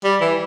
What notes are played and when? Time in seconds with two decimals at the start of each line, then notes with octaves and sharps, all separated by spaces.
0.04 G3
0.21 E3